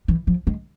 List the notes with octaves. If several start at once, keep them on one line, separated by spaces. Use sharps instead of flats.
E3
F3
G#3